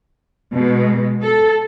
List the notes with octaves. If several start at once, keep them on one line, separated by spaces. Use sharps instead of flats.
B2 G#3
A4